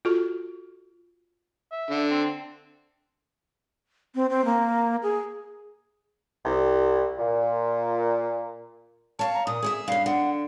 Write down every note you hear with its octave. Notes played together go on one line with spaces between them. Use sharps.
F4 F#4 A4
E5
D3
C4
C4
C4
A#3
G#4
C2
A#2
C#5 F5 A5
A#5
A#2 D#6
G#4 C#5 E5
G2 C#4 F5
D3 F#5